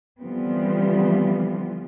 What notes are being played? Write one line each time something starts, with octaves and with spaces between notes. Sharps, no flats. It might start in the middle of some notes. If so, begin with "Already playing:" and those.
D3 E3 F3 G3 B3 C4